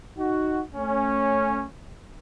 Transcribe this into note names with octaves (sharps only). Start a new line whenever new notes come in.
D#4 F#4
A3 C#4